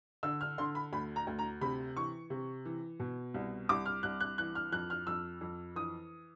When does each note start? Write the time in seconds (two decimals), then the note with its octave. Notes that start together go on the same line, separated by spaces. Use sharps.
0.23 D3 E6
0.41 F6
0.58 D3 C6
0.75 B5
0.93 D2 B5
1.16 A#5
1.27 D2
1.39 A#5
1.61 C3 B5
1.96 E3 C#6
2.30 C3
2.65 E3
3.00 B2
3.34 C2
3.69 C2 D6
3.86 F6
4.03 C2 F#6
4.20 F#6
4.38 E3 F#6
4.55 F6
4.72 F2 F#6
4.90 F6
5.07 F2 E6
5.41 F2
5.76 E3 D#6